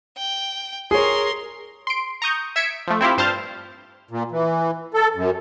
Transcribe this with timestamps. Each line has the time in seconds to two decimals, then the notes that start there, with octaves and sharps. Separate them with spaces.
0.17 G5
0.91 G#4 A#4 C#5 C6
1.87 C6 D7
2.22 A#5 C#6 D#6 G6
2.56 E5 E6 G#6 B6 C#7 D7
2.87 F3 A3
3.01 C4 E4 F4 G4
3.17 G2 C5 A5 F6
4.11 A#2
4.31 E3
4.94 A4
5.15 F#2